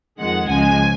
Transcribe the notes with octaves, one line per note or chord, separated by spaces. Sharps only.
F2 D#3 G#3 F#5
C#2 C#3 F3 G#3 G#5